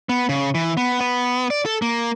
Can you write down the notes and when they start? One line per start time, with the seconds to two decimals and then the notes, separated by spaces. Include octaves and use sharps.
0.09 B3
0.29 C#3
0.55 E3
0.77 B3
1.00 B3
1.50 D5
1.65 A4
1.82 A#3